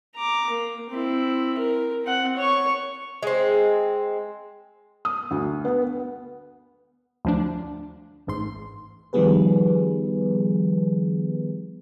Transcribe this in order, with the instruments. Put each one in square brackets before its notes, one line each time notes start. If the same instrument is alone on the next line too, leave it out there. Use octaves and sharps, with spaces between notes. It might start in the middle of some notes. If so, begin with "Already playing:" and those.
[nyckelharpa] A#5 D6
A#3
C4 E4
A#4
C4 F#5
C#5 C#6
[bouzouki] G#3 C4
[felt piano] D#6
D2
B3
B3
[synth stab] D2 F3 D4
A1 G#2 C6
[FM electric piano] D#3 F3 G3 B3 G#4 B4